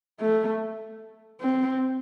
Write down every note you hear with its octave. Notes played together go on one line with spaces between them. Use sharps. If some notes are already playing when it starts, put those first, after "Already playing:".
A3
C4